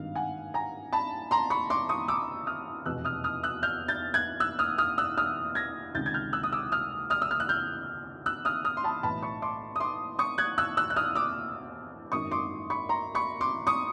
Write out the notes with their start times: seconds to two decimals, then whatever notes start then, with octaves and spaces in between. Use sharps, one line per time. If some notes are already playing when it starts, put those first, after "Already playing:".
Already playing: G#1 G2 D#3 F5
0.15 F#5 G#5
0.54 G#5 A#5
0.93 A5 B5
1.31 A#5 C6
1.50 B5 C#6
1.70 C6 D6
1.89 C#6 D#6
2.08 D6 E6
2.47 D#6 F6
2.85 F1 E2 B2 E6 F#6
3.05 D#6 F6
3.24 D#6 F6
3.43 E6 F#6
3.63 F6 G6
3.88 G6 A6
4.14 F#6 G#6
4.40 E6 F#6
4.59 D#6 F6
4.78 D#6 F6
4.98 E6 F#6
5.18 D#6 F6
5.55 G#6 A#6
5.95 C#2 C3 D#3 G6 A6
6.06 G#6
6.14 F6 G6
6.33 E6 F#6
6.43 D#6
6.52 D6 E6
6.72 D#6 F6
7.10 D#6 F6
7.22 E6
7.31 F6
7.40 F#6
7.49 F6 G6
8.26 E6 F#6
8.45 D#6 F6
8.65 D#6 F6
8.77 C6
8.84 A5 B5
9.03 B1 A2 E3 A5 B5
9.23 B5 C#6
9.42 C6 D6
9.76 D#6
9.80 C6 D6
10.19 C#6 D#6
10.38 F#6 G#6
10.58 E6 F#6
10.77 E6 F#6
10.90 F#6
10.96 D#6 F6
11.15 D6 E6
12.12 G#1 F#2 D#3 C#6 D#6
12.31 C6 D6
12.70 B5 C#6
12.89 A#5 C6
13.15 B5 C#6
13.41 C6 D6
13.67 C#6 D#6